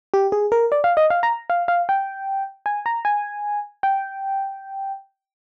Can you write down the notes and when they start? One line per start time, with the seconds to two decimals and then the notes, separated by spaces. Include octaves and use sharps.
0.14 G4
0.32 G#4
0.52 A#4
0.72 D5
0.84 F5
0.97 D#5
1.10 F5
1.23 A#5
1.50 F5
1.68 F5
1.89 G5
2.66 G#5
2.86 A#5
3.05 G#5
3.83 G5